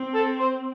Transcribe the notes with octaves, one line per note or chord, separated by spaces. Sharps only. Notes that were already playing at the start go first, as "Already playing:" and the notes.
Already playing: C4
A4
C5